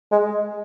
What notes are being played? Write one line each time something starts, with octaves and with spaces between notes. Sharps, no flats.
G#3